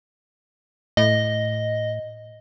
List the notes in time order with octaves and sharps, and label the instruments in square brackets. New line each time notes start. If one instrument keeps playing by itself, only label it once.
[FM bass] A2 [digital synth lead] D#5